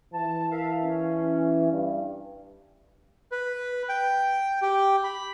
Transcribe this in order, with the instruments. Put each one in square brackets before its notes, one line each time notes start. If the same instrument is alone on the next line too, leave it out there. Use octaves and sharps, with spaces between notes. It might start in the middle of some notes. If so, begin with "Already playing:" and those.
[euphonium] E3 [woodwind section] A5
[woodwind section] A#4 E5 F5
C#4
[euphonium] G2
[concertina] B4
G5
G4
B5